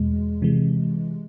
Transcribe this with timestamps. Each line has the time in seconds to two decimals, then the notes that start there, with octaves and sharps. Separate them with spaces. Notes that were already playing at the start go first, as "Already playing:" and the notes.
Already playing: E2 B2 G#3
0.42 C3 E3 G#3